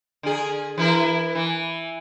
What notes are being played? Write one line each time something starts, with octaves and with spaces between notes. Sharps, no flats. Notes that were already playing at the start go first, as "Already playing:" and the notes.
D3 G#4
E3 E4 A#4
E3